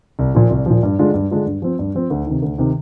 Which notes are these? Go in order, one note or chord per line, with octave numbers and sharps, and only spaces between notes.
C2
A#2 F3
C2
A#2 F3
G2
D3 G#3 D4 F4
G2
D3 G#3 D4 F4
G2
F3 C4
G2
F3 C4
D2
C3 D#3
D2
C3 D#3